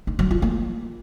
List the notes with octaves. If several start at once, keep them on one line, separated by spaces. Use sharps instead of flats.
D#4
F#3
F4
A#3